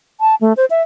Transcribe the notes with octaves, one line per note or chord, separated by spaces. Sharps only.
A5
A3
C5
E5